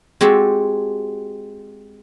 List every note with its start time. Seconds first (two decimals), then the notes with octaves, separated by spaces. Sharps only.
0.21 G#3 C4 F#4 G4 A4